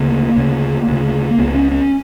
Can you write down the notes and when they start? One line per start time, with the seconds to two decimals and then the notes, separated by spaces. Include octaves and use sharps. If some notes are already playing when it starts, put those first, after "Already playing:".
Already playing: D2 C#3 A#3
0.36 D2 C#3
0.87 D2 C#3
1.31 A#3
1.38 C#2 C#3 B3
1.55 C#4
1.71 C#4